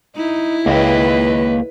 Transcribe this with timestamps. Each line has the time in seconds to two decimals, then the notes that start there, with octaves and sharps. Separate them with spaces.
0.16 D#4 E4
0.66 C#2 A#3 B4 D#5 G5